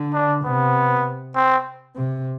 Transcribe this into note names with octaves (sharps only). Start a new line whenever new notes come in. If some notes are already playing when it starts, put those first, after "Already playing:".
Already playing: D3
D4
C3 B3
C4
C3